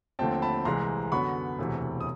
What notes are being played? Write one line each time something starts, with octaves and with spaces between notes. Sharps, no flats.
D#2 D3 F3 A3 C4 G5 A5
A5 B5
C2 C3 E3 G#3 A#5 C6
F#2 D3 F#3 B3 B5 C#6
E1 D2 C3 E3
D#6